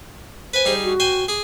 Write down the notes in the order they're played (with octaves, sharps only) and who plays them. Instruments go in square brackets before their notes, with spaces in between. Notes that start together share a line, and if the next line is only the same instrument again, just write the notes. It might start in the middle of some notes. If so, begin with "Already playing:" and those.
[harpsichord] B4 G#5 [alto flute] C5
[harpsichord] G3 D#4 G#4
[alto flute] F#4
[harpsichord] C5 G5 G#5
G#4 D6